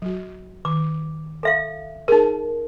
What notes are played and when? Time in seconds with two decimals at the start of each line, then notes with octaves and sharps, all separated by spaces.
0.02 F#3 F#4
0.65 D#3 D6
1.43 A4 E5 F5
2.08 D#4 G#4 A#4 A5